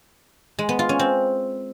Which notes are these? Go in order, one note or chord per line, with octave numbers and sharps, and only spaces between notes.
G#3
B3
F4
C#4
C4